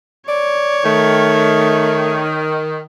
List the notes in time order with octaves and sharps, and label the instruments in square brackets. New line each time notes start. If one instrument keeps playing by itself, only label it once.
[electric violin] C#5 [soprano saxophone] D5
[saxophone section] D#3 [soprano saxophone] A3